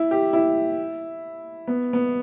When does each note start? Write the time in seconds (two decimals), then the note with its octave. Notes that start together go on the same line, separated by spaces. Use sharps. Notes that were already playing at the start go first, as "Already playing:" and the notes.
Already playing: E4
0.11 G4
0.33 E4
1.68 B3
1.93 B3